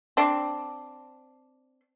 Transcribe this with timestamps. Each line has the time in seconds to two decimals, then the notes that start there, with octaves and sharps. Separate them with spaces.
0.17 C4 D4